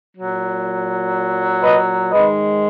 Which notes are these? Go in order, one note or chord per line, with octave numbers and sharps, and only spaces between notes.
F#3
A#2
B4 D#5
G#2 D#3 G#3 B4 D#5